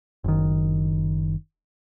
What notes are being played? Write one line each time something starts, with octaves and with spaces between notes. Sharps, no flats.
F#1 D#3